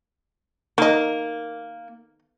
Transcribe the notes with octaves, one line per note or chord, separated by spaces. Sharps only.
D#3 A#3 D#5